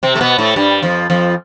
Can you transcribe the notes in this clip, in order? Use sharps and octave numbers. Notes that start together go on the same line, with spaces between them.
C3 C4
A3
B2 B3
A2 A3
G2 G3
F2 F3
F2 F3